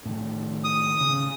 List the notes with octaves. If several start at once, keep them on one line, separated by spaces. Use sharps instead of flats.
A2 D#3
D#6
C#3